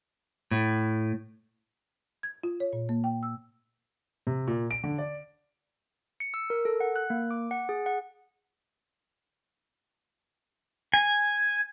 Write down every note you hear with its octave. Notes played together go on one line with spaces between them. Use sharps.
A2
G#6
F4
C#5
A#2
A#3
G5
E6
C3
A#2
D7
D3
D5
C#7
E6
A#4
A4
F#5
F#6
A#3
D6
F#5
G#4
F#5
G#5